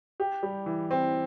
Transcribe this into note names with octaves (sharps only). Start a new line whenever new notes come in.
G4
G3
E3
C4